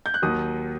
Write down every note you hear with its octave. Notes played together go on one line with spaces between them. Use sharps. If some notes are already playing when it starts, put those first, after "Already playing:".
G6
F#6
D#2 D#3 F#3 D#6